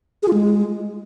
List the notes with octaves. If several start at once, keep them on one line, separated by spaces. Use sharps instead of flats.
G#4
F4
G#3